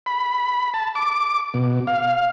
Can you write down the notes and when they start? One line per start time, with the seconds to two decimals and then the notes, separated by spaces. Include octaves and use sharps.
0.06 B5
0.74 A5
0.95 D6
1.54 B2
1.87 F5